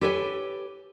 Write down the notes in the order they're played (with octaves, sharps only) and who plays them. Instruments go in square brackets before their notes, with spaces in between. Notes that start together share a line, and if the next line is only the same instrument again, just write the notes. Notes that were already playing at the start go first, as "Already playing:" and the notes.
[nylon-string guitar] G4 A4 B4 C#5 G5 G#5